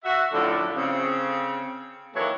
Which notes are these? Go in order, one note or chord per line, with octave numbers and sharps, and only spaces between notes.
F#4 E5
F#2 A2 D3 F3 A4
C#3 C4
D#3 E3 F#3 A#3 A4 C#5